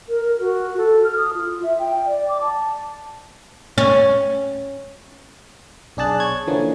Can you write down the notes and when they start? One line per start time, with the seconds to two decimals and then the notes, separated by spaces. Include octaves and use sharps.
0.09 A#4
0.24 A#4
0.39 F#4
0.77 A4
1.04 F6
1.16 D#6
1.34 F4
1.63 E5
1.79 G5
2.06 D5
2.28 D6
2.41 A5
3.78 C#4
5.97 B1 D4 G#4 A5 F#6
6.20 C#5 G#6
6.47 D3 E3 F3 A#3 B3 C#4